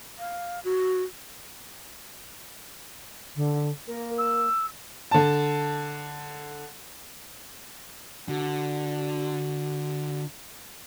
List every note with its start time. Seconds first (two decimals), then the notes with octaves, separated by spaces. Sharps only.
0.19 F5
0.64 F#4
3.35 D3
3.87 A#3 A#4
4.18 E6
5.11 D3 A5
8.28 D3 F#4